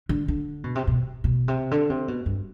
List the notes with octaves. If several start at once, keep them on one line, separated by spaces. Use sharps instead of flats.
D3
D3
B2
C3
B2
B2
C3
D3
C3
B2
G2